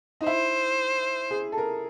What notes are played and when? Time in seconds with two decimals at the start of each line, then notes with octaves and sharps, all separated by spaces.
0.21 D#4
0.26 E4 C5
1.31 G#4
1.52 A4
1.58 A#4